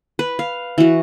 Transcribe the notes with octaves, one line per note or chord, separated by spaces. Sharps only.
B4
F5
E3 F#4